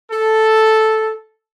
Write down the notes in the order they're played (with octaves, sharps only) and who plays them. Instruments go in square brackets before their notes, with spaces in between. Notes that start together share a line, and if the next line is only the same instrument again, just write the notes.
[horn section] A4